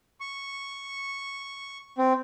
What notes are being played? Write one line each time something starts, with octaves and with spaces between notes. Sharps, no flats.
C#6
C4